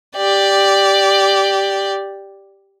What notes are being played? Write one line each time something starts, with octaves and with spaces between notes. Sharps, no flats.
G4 D5